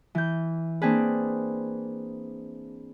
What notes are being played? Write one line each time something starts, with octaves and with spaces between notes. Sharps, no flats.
E3 G6
A#3 C4 D4 G#4 B4